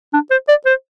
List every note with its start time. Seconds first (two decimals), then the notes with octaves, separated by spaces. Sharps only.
0.13 D4
0.31 C5
0.48 D5
0.66 C5